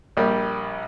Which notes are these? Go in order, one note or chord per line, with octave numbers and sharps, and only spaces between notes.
A#1 G3 A#3